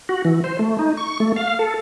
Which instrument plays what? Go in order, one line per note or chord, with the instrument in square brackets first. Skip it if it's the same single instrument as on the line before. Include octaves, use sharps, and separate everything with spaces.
[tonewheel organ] F#4
E3
C5
A3
D#4
C#6
A3
F5
A4